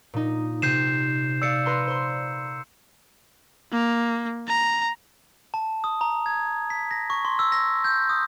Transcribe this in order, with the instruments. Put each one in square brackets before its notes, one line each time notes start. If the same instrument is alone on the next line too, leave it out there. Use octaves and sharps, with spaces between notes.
[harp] A#2 D#4
[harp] C3 D#7 [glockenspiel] G6 C7 E7
[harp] D5 F5 [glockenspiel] E6 C#7
[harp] B4 A#5 C6
C5 C6
[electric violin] A#3
A#5
[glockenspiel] A5
D#6
A#5
G#6
B6
A#6
C#6
C6
E6
A#6
G6
D#6